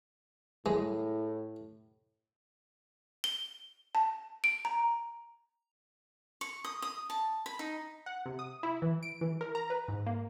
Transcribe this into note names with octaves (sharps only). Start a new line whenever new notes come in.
A2 G#3
G7
A5
D7
A#5
C#6
D#6
D#6
A5
B5
D#4
F#5
C3
D#6
E4
E3
D7
E3
A#4
A#5
B4
G#2
A#3